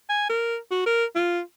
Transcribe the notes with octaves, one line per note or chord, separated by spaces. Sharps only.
G#5
A#4
F#4
A#4
F4